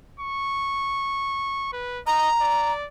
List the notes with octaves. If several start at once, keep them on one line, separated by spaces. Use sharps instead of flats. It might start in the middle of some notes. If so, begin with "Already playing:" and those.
C#6
B4
D#5 A#5
D5